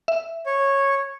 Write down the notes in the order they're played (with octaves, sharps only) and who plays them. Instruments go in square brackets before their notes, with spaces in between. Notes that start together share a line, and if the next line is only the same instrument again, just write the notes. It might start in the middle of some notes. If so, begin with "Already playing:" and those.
[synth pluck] E5
[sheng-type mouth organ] C#5